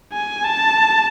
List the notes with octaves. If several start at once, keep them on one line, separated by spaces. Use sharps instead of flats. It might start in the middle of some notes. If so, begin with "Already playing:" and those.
G#5
A5